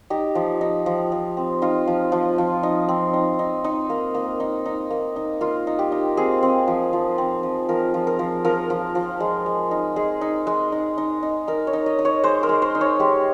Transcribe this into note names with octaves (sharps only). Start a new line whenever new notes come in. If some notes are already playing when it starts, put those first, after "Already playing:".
D#4 G4
F3
D#4
F3
F3
C4
D#4 F4
F3
F3
F3
D#4
C4
D#4
D#4
D#4
A#3
A#3
D#4
D#4
A#3
D#4
A#3 F4
D#4
G4
D#4
C4 G#4
C4
F3
F3
C4
F3
F3 A#4
F3
A#4
F3
F3 A#4
F3
F3
G#3
G#3
D#4
G#3 G#4
D#4
G#3
D#4
D#4
D#4
D#4 A#4
C#5
D#4
D#5
D#4
C#5
G#3 C5
A#4
G#3
C5
D#4
C#5
G#3 G4